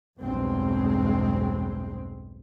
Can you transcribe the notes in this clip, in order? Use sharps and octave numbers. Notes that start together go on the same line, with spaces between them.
B1 E2 G2 G#3 C4